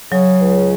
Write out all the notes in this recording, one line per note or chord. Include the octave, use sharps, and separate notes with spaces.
C#3 F#3
C#2